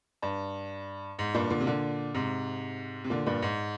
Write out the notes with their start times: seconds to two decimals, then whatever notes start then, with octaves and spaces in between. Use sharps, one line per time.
0.22 G2
1.19 G#2
1.34 G2 A#2
1.50 A#2 D3
1.60 C3
1.67 A#2 D3
2.14 G#2 C3
3.04 C3
3.10 A#2 D3
3.26 G2 A#2
3.42 G#2